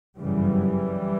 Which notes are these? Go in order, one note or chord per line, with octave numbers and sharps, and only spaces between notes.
G1 F#2 C#3 E3 G3